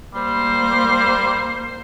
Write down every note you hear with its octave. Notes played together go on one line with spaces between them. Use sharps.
G3 A#3 C5